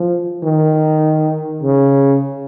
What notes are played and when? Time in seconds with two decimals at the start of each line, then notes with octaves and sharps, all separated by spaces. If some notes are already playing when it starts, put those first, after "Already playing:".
Already playing: F3
0.43 D#3
1.63 C#3